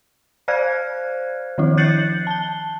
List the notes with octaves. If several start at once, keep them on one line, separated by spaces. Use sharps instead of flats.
C5 D5 F5 F6 F#6 G#6
D#3 F3 E4
F#6 G6 A6 C7 C#7 F#7
A5 G7